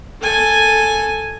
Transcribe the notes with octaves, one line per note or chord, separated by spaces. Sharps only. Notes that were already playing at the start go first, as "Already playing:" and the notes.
A4 G#5